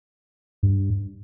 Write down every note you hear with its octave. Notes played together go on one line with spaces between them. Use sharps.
G2